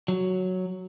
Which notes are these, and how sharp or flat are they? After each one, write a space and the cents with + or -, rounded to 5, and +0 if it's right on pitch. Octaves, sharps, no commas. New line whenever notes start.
F#3 +0